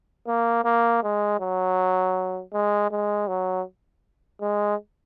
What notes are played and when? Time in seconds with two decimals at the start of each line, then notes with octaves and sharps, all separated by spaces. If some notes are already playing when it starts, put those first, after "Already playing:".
0.28 A#3
0.65 A#3
1.03 G#3
1.40 F#3
2.54 G#3
2.91 G#3
3.28 F#3
4.41 G#3